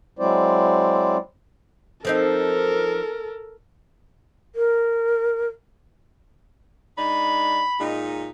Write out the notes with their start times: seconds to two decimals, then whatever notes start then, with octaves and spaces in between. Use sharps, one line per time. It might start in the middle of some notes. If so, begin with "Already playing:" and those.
0.19 F#3 G#3 C4 E4 C5 D5
2.05 F3 C4 D#4 A4 A#4
4.55 A#4
6.98 G#3 D4 D#4 B5
7.79 A#2 G#3 D#4